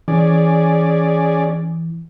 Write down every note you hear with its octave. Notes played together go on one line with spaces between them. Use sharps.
E3 C#4 G#4 D5